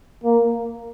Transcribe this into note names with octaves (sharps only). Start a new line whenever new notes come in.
A#3